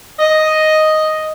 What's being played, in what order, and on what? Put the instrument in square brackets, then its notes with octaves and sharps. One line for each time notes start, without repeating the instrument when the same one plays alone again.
[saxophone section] D#5